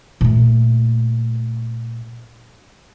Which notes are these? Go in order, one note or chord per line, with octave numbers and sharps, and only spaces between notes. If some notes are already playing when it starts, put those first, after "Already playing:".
A#2 A3